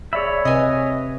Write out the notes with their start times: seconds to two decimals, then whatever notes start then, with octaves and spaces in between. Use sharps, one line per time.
0.13 G#4 C#5 D5 E5 B5
0.45 C3 B4 D#5 G#5 D#6